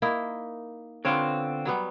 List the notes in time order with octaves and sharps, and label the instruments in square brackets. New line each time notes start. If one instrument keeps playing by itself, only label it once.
[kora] A#3 D#4 E4
[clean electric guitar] D3 C4 F4 [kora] B3 C#5
[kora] F#3 G3 B3